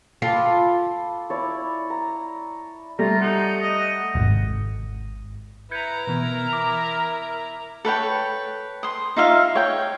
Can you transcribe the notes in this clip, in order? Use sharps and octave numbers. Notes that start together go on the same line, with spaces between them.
F4 A4 B5 D6
E4 C#5 D5
A#5
G3 A3 F4 A#5
D#4 F#5
D#5
D#1 G#1
E4 B4 A#5 G6 G#6 C#7
B2 E3 B3 A#4
D6
A4 B4 C#5 G5
C6 D#6
D#4 F4 E5 F5
C#5 G5